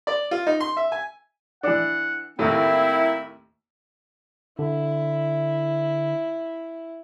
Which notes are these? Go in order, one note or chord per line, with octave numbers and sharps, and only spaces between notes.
D5
F4
D#4
C6
E5
G#5
E3 D4 F#5
D#2 A2 A#3 C4 E4
D3 E4